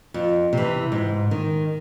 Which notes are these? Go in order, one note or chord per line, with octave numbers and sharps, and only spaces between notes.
F2
C3 E3
G#2
D#3